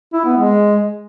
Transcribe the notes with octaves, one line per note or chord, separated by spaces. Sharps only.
E4
B3
G#3